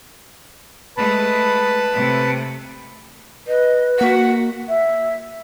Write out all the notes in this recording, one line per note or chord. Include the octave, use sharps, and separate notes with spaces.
G#3 A3 B4 A5 B5
C3 A3
B4 D#5
A#3 F#4 F#5 B6
E5